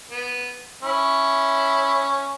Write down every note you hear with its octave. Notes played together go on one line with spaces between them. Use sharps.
B3
C#4 E4